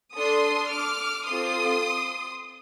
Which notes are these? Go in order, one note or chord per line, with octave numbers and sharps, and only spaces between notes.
D4 A4 C6 D#6
D6 F6
C4 F4 A4 C6 D#6